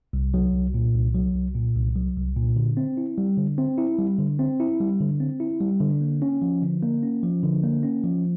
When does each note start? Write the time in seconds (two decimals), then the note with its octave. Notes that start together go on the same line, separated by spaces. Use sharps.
0.13 C2
0.34 F#3
0.53 C2
0.74 A#2
0.94 C2
1.14 F#3
1.35 C2
1.55 A#2
1.75 C2
1.96 F#3
2.17 C2
2.36 A#2
2.56 D3
2.77 C4
2.97 E4
3.18 G3
3.38 D3
3.58 C4
3.78 E4
3.98 G3
4.19 D3
4.39 C4
4.60 E4
4.80 G3
5.00 D3
5.20 C4
5.40 E4
5.61 G3
5.80 D3
6.01 A#3
6.22 C#4
6.42 F3
6.62 D3
6.83 A#3
7.03 C#4
7.23 F3
7.43 D3
7.63 A#3
7.83 C#4
8.04 F3